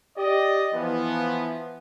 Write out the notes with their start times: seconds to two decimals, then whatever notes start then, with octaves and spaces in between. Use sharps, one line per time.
0.18 G4 D5 D#5
0.74 E3 F3 B3